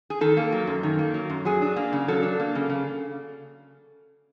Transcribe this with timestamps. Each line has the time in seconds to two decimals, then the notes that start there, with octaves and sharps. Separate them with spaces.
0.10 G#4
0.21 D#3 A4
0.37 A#3
0.52 F#3
0.67 F#2
0.83 D#3
0.99 A#3
1.14 F#3
1.30 F#2
1.45 F#3 G#4
1.62 D4
1.76 A#3
1.93 C#3
2.08 F#3 A4
2.23 D4
2.40 A#3
2.55 C#3
2.70 C#3